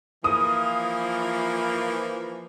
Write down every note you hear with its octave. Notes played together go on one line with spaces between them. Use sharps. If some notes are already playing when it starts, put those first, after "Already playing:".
E3 F3 A#3 D#6